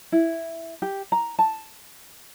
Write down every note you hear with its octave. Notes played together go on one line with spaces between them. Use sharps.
E4
G4
A#5
A5